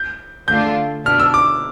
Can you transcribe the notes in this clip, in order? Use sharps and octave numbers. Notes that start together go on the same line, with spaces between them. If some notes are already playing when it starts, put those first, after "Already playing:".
Already playing: G6
D3 A3 D4 F4 G6
B2 B3 D4 F6
E6
D6